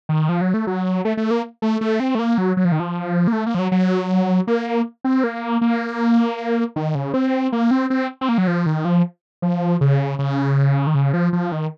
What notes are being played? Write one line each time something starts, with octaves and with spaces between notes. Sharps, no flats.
D#3
F3
F#3
A3
F#3
A3
A3
A#3
A3
A3
C4
A3
A#3
F#3
F#3
F3
D#3
F3
A#3
A3
A#3
F3
F#3
F#3
A#3
C4
A#3
A#3
D#3
C#3
C4
A#3
C4
C4
C4
A#3
F#3
F3
D#3
F3
F3
C#3
C#3
D#3
C#3
F3
F3
D#3